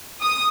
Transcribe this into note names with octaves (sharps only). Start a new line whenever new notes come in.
D#6